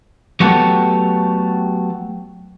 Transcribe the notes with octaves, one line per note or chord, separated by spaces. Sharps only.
F#3 A3 B3 F#4 G4 A4